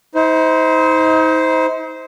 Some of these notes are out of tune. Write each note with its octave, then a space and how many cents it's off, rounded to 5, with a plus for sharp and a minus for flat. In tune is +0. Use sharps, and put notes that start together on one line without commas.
D#4 +40 C5 -15